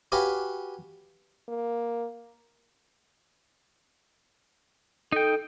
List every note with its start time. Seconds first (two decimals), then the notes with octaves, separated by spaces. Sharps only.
0.12 F#4 G4 B4 C#5 F5 G#5
1.49 A#3
5.12 D#4 A4 G5